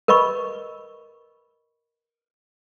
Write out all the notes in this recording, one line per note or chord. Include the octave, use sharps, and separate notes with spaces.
A#4 B4 D#5 B5 C#6